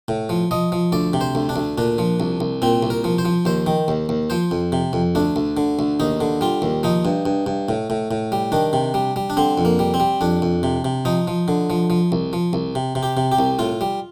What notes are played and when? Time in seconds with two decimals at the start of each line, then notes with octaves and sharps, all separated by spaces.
0.08 A2
0.29 F3
0.51 F3 D#5
0.72 F3
0.92 D2 D5
1.13 C3
1.21 C5
1.35 D2
1.49 D4
1.56 D2
1.78 A#2 D4
1.98 F3
2.20 C2
2.40 C2
2.62 A#2 C4
2.83 C2
2.90 A#4
3.04 F3
3.18 C5
3.25 F3
3.45 D#2 C5
3.66 D#3
3.88 D#2
4.09 D#2
4.30 F3 C5
4.51 F2
4.72 C3
4.93 F2
5.15 D2 D4
5.36 D2
5.57 D3
5.79 D2
6.00 D#2 D#4
6.21 D3
6.41 G3 F4
6.62 D#2
6.83 F3 D#4
7.05 G2
7.26 G2
7.46 G2
7.69 A2
7.90 A2
8.11 A2
8.32 G3
8.52 D#3 D4
8.73 C3
8.94 G3
9.16 G3
9.30 D4
9.37 D3 C4
9.58 F2
9.65 A#3
9.79 G3
9.94 C4
10.00 G3
10.21 F2 D4
10.42 F2
10.63 C3
10.85 C3
11.05 F3 D#4
11.27 F3
11.48 D3
11.70 F3
11.90 F3
12.12 C2
12.33 F3
12.53 C2
12.75 C3
12.95 C3
13.03 G4
13.17 C3
13.32 G4
13.39 C2
13.59 A2 F4
13.81 G3